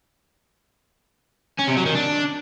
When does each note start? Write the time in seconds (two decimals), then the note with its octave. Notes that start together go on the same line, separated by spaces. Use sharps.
1.59 C#4
1.68 C3
1.77 F#3
1.86 D#3
1.95 D4